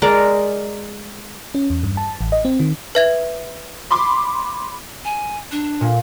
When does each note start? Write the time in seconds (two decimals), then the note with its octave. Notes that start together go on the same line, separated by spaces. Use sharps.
0.02 G#3 A#4 D5
1.55 C#4
1.70 E2
1.83 G2
1.97 A5
2.21 A1
2.32 D#5
2.45 C4
2.60 D#3
2.95 B4 E5 G#6
3.91 B5 C6 D6
5.05 G#5
5.52 D4
5.81 A#2